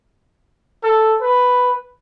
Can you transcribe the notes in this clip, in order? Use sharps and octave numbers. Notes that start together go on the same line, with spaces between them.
A4
B4